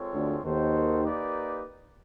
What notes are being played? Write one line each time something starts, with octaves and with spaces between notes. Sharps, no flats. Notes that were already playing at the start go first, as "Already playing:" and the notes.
Already playing: G#3 C4 F4 A4 C#5
D2 D3
D#2 D#3 F#4 A4 C5
A#3 D#4 G4 B4 D5